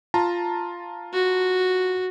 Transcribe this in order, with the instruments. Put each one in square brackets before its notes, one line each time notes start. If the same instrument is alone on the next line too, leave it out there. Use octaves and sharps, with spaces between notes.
[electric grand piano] F4 A5 A#5
[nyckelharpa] F#4